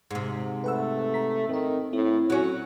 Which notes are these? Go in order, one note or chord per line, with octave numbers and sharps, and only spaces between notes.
G#2 C3
A3 B4 F#5 E6
A#5 B6
D#3 C4 A#4
A2 C4 E4
F#3 C#4 F#4